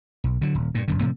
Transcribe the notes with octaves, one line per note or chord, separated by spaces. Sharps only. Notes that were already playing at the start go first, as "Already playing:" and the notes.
B1
D3 F#3
D#1
G2 A#2
D#1 F#2 D3
A2 C3 F3 A#3